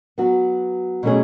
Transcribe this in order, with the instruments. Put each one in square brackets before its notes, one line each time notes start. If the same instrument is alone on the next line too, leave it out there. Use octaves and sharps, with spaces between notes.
[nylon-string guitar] F#3 B3 F#4
B2 F#3 A3 C#4 G#4